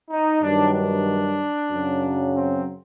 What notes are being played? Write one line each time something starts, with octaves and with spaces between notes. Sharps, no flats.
D#4
G2 D#3 F#3 D4
D4
F#2 C#3 F#3
C4